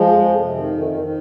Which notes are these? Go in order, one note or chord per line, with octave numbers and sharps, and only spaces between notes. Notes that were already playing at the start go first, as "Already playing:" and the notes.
Already playing: F3 G#3
F2
F2
C3
D#3
F2
D#3
D#3